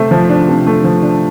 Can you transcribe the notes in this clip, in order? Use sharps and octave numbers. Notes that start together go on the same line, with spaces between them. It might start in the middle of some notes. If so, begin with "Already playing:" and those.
Already playing: C3 A3 C5 E5
F3
D4
C3
A3
F3
D4